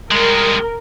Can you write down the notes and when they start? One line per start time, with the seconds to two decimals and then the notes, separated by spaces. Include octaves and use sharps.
0.11 G2 G#3 A#4